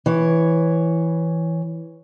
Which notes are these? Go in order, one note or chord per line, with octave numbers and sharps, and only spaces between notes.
E3 C#5